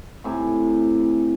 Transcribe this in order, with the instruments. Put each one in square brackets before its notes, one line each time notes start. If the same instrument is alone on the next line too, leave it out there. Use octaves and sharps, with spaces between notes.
[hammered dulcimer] A2 C3 G#5